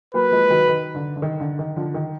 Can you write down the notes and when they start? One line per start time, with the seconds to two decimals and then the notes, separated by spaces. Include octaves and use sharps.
0.14 F#3 A#3 B4
0.31 F3 G#3
0.50 D#3 F#3
0.68 D#3
0.95 D3
1.16 D3
1.22 D#3
1.40 D3
1.59 D#3
1.76 D3 F3
1.94 D#3